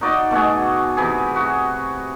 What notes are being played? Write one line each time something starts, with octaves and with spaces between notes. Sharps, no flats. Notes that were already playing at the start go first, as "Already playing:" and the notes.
D#4 F#4 D5 D#5
B2 A3 F#4 G#4
C3 E3 G#4
F#4